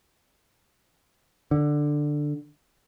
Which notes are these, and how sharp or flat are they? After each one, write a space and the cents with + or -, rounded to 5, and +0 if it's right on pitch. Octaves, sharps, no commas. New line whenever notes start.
D3 +10